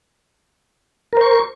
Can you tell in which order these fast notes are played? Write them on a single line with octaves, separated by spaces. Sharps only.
A#4 C5 C#6